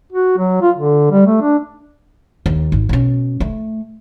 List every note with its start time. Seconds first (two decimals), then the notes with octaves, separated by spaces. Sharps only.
0.13 F#4
0.38 F#3
0.62 F4
0.77 D3
1.11 G3
1.27 A3
1.41 D4
2.46 D#2
2.72 G#1
2.89 B2 C#4
3.40 A3